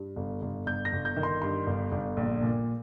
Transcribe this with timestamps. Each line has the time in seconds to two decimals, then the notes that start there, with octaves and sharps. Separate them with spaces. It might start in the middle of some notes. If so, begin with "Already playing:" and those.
Already playing: G2
0.16 G1
0.42 G1
0.66 G1 G6
0.85 A#6
0.93 G1
1.05 G6
1.16 D#3
1.23 C6
1.42 G2 C6
1.67 G1
1.92 G1
2.17 A#1
2.42 A#2